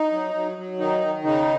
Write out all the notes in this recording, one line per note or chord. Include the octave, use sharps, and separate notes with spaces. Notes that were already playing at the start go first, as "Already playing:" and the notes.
Already playing: D#4
F#3
F#3
F#3
D#3 D#4
D#3
C#3 D#4